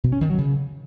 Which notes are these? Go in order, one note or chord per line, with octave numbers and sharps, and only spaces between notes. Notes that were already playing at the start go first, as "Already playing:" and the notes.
B2
C#4
D#3
F#3
C#3